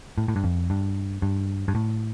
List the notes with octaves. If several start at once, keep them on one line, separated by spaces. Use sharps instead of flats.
A2
A2
G2
F2
G2
G2
G2
A2